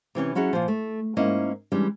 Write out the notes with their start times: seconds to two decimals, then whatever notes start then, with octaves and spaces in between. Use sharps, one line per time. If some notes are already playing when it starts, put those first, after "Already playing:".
0.15 C3 E3 C#4 G5
0.35 F#3 C#4 E4 F#4 G#4
0.53 A#2 F3
0.68 A3
1.17 G#2 A#3 C#4 E4 D#5
1.72 E3 G3 G#3 C#4 D4